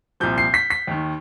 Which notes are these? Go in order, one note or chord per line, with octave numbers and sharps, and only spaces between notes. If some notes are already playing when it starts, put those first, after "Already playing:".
C2 A#2 F3 G6
C7
B6
B6
D#2 D#3